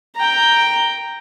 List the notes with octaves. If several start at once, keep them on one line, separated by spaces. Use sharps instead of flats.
G5 A#5